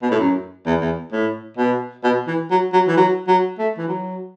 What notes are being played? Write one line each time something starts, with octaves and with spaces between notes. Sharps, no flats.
B2
A2
F#2
E2
E2
A2
B2
B2
E3
F#3
F#3
E3
F#3
F#3
A3
E3
F#3